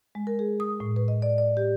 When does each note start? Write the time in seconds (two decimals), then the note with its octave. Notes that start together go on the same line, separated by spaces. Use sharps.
0.15 G#3
0.27 A#4
0.39 G#4
0.60 D#6
0.80 A2
0.96 B4
1.08 D#5
1.22 D5
1.38 D5
1.57 G4